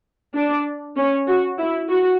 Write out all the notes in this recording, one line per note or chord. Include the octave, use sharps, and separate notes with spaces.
D4
C#4
F#4
E4
F#4